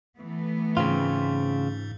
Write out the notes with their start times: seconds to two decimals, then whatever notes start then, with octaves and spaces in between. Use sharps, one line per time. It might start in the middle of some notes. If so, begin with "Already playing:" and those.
0.18 E3 A3 B3
0.77 G#2 C#3 C4 F4